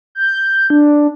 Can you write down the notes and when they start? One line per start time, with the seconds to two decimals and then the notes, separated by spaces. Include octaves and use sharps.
0.15 G6
0.70 D4